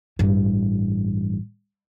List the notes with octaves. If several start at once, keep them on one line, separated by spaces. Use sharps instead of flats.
A1 G2